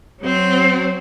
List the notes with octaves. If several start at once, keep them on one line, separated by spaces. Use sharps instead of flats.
F#3 C4